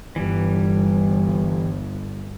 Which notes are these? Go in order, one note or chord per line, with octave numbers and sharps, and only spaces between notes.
G1 E3 G3